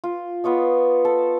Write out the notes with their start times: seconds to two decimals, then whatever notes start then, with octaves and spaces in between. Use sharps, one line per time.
0.04 F4
0.44 B3 F4 C#5 D#5
1.05 A4